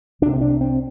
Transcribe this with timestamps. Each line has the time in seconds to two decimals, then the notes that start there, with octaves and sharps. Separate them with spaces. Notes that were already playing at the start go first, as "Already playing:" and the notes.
0.21 C2 C3 D4
0.34 C4
0.41 D4
0.61 C4